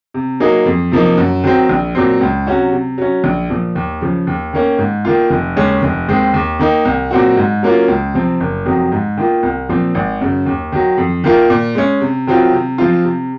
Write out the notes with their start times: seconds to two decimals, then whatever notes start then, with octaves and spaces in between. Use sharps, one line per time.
0.14 C3
0.40 F#3 A#3 D#4 G#4
0.66 F2
0.92 C3 F3 A#3 D#4
1.17 F#2
1.44 D#3 F#3 C4
1.69 A#1
1.95 A#2 F#3 C4
2.21 C#2
2.47 C3 F#3 C#4 F#4
2.72 C3
2.98 F#3 C#4
3.24 A#1
3.50 A#2 F3
3.75 D#2
4.01 C#3 F3
4.27 D#2
4.53 D#3 A#3 C#4
4.78 G#2
5.05 D#3 A#3 F4
5.30 F1
5.56 D#2 C#3 G#3 C#4
5.82 F1
6.08 D#2 D#3 G#3 C4
6.34 D#2
6.59 D#3 A#3 D#4
6.85 C2
7.11 A#2 F#3 C4 F#4
7.37 G#2
7.63 F#3 A#3 C#4 F4
7.88 C#2
8.14 C3 F3 C4
8.40 F#1
8.65 F2 C3 D#3 F#3
8.92 G#2
9.17 D#3 A#3 F4
9.43 C2
9.69 A#2 F3 C4
9.95 G#1
10.21 F#2 C#3
10.46 D#2
10.72 D#3 F#3
10.98 F2
11.24 D#3 A#3 F4 A#4
11.50 A#2
11.75 G#3 C#4
12.01 C3
12.27 D#3 F#3 C4 F4
12.53 C3
12.78 F3 C4 F4
13.04 C3